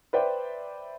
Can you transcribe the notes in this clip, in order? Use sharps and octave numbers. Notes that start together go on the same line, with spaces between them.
B4 C5 D5 E5 G5